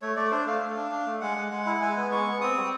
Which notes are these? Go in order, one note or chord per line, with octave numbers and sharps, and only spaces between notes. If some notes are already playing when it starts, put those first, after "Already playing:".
A3 C#5
A3 D5
D4 C5
A3 F5
A3
D4
D4
A3
G#3 F#5
G#3
G#3 F#5
E4
G#3 G#5
B3
G#3 C#6
B3
C4 D#6
G3